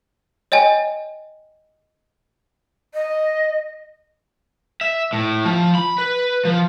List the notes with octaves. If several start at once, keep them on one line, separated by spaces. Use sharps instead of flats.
C#5 D#5 G5 G#5
D#5
E5
A2
F3
B5
B4
F3